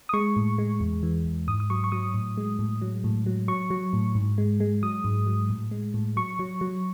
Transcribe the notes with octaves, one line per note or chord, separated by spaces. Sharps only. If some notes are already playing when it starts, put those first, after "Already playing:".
D#6
G#3 C#6
A2
G#3
E2
E3
E2
G#2 D#6
D#6
F#3 C#6
C#6
F#3 D#6
A2
G#3
A2
F#3
A2
F#3
F#3 C#6
F#3
A2
G#2
G#3
G#3
F#3 D#6
G#2
F#3
A2
G#3
A2
F#3 C#6
F#3
F#3